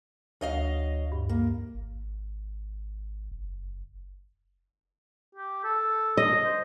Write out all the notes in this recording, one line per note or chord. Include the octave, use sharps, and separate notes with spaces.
D2 F#3 D#5 F5
G2
A#3
G#1
F#1
G4
A4
D#5
C5